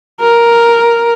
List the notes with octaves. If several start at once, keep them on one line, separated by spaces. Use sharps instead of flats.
A#4